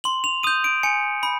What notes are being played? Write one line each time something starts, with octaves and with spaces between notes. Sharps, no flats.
C6 F#7
F7
D#6 G6 D#7
D7
G#5 C#7
B5